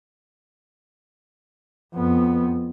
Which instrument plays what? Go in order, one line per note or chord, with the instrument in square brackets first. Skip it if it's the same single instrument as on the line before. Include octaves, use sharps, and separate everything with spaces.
[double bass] F2 B3